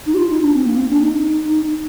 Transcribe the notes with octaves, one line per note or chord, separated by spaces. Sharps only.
D#4
G4
F4
D#4
D4
C4
A#3
C4
D4
D#4